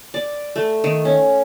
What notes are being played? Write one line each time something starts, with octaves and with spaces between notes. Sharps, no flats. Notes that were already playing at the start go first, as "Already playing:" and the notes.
D5
A3
D#3
C#4